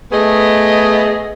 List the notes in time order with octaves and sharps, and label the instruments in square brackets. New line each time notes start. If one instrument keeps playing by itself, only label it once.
[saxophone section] A3 B3 G#4 D#5